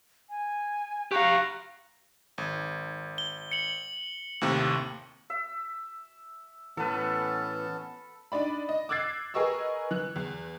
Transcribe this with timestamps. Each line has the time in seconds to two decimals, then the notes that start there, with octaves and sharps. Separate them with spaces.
0.30 G#5
1.11 G4 F5 F#5 A#5 C#6
2.38 G#1
3.18 G7
3.52 C#7 F#7
4.41 D#2 A2 C3
5.30 E5
6.77 A2 E3 B3 C#4 A4 B4 A5
8.32 D4 D#4 D5 B5
8.69 D#5
8.89 D6 E6 F#6 G#6 A6 C7
9.34 G#4 A#4 B4 D#5 C#6 E6
9.91 E3 F#6
10.16 E2